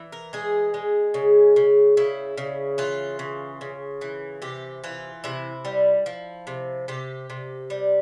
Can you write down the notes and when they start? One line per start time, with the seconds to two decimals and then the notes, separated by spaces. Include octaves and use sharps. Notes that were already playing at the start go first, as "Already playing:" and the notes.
Already playing: E3
0.12 A#4
0.33 G#3 G#4
0.74 G#3
1.14 C#3
1.56 C#3
1.97 C#3 E4
2.38 C#3
2.78 E3 F4
3.19 C#3
3.61 C#3
4.01 E3
4.42 C3 G4
4.84 E3 F4
5.24 C3 E4
5.65 G3
6.06 F3
6.47 C3
6.88 C3 G4
7.30 C3
7.70 G3